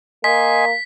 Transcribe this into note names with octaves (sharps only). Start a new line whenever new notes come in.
A#3 D#5 G#5 C6 B6